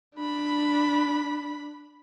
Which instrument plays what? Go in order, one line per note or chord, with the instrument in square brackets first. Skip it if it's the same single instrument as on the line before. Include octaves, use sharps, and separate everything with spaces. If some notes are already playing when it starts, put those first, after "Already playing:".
[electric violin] D4 B5